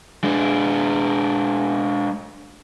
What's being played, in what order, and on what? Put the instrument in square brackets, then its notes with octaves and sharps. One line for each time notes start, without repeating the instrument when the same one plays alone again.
[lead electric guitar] G#3 D4